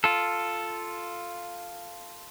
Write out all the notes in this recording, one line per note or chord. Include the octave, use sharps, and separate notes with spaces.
F4 A4